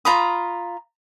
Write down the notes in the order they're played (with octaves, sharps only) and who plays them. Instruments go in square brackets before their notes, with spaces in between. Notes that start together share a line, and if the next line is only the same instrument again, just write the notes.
[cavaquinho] F4 A#5 B5 D#6